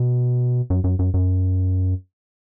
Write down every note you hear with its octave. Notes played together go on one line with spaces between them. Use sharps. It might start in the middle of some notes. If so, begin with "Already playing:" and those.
Already playing: B2
F#2
F#2
F#2
F#2